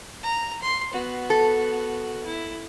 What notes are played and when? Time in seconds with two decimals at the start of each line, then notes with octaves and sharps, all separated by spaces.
0.23 A#5
0.63 C6
0.93 B3 F#4
1.30 A4
2.26 E4